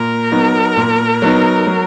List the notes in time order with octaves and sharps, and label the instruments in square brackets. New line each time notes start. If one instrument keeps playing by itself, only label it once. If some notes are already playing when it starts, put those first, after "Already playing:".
Already playing: [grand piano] A#2 [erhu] A#4
[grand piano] F#3 B3 D#4
A#2
F#3 B3 D#4
F#3